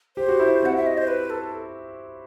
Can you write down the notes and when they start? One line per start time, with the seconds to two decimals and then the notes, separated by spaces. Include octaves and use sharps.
0.17 G4 C5
0.29 F#4
0.40 E4
0.62 C4 F#5
0.76 E5
0.87 D#5
0.98 C5
1.07 B4
1.30 A4